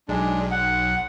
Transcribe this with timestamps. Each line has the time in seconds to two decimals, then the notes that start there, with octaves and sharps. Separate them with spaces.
0.09 B1 G#3 D4
0.51 F#5